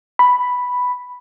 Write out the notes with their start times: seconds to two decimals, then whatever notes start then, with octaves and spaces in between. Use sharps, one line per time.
0.19 B5